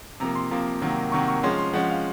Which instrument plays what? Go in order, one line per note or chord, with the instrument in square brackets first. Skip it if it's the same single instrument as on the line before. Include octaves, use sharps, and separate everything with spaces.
[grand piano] C3 F3 A#3 A#5
C6
C3 F3 A#3
C3 D#3 F#3 A#3
C3 D#3 F#3 A#3 C#6
C#6
F3 G#3 C#4 C6
C6
F3 G#3 C#4 F#5
F5